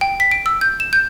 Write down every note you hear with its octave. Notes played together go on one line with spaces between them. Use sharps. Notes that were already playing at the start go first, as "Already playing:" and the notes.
G5
B6
D7
E6
G6
E7
G6